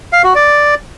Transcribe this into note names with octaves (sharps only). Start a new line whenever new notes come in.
F5
F#4
D5